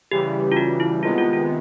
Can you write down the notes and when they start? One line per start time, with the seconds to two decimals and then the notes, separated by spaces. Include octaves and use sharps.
0.11 C#3 E3 G3 G4
0.52 F4
0.57 F#4
0.80 E4
1.03 C3 D#3 G#3 B3 F4
1.18 F4
1.33 F4